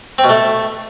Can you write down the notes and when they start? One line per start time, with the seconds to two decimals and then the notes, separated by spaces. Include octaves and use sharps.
0.18 C4
0.24 B2
0.29 A3